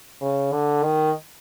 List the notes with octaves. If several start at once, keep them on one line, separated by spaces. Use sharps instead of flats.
C#3
D3
D#3